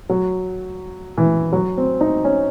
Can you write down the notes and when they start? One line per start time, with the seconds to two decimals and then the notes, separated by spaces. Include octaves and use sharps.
0.09 F#3
1.17 E3
1.52 F#3
1.77 C4
2.01 D#4
2.25 C#4